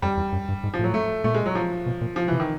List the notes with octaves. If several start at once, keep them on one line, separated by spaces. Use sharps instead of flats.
F2 G3
E2
F#2
G2
G#2
F3
A2 F#3
A3
A#2 A3
G#3
F#3
F3
B2
A#2
F3
C3 E3
D#3